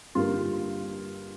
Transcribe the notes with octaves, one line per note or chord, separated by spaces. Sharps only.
G2 D3 G3 A#3 F4